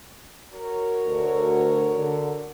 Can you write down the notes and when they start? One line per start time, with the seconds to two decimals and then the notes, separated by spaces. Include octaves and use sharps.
0.52 F#4 A#4 C#5
1.07 D2 D3
1.98 D3